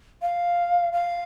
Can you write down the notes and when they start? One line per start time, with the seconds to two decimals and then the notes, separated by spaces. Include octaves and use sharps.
0.22 F5
0.93 F5